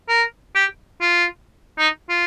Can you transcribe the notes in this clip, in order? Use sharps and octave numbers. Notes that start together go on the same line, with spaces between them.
A#4
G4
F4
D#4
F4